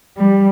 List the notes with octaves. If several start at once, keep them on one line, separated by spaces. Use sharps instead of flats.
G3